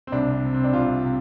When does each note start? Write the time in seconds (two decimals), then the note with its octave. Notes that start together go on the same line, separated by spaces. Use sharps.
0.07 C4
0.12 C2 D4
0.44 C3
0.54 C4
0.64 D4
0.73 C2 F4
1.04 C3